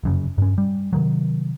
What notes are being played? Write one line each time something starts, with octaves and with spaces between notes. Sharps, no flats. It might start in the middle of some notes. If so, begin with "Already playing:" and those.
F1 F#2 C#3
G2 C#4
G3
C3 D#3 F#3